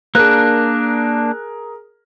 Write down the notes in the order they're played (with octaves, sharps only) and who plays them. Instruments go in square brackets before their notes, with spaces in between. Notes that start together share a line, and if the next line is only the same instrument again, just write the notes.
[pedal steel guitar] A#3 D4 [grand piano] G#4 A#4 [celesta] F#6